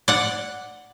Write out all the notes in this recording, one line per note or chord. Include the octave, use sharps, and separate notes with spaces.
D5 F#5